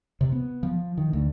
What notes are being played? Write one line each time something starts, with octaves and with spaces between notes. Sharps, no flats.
C3
B3
F3
D#3
D2